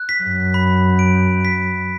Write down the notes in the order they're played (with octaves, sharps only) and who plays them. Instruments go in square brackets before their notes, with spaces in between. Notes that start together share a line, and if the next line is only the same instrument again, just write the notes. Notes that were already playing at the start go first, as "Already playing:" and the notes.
Already playing: [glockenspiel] F#6
B6
[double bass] F#2
[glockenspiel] B5
D7
B6